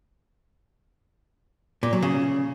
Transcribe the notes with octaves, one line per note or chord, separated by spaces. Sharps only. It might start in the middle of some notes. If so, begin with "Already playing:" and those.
A#2
F#3
C#3